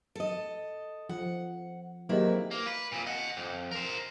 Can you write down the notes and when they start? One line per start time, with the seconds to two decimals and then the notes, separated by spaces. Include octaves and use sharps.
0.15 A4 D#5
1.09 F3 F#5
2.09 G#2 C3 D#3 F#3 A#3 E4 B4
2.51 A#3
2.67 B4
2.92 C2 A#2
3.07 D#5 F#5
3.37 F2
3.71 A#4 C5